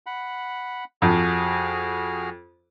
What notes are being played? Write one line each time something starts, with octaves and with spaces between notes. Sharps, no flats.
F#5 B5
F2 F#4 G#4 F6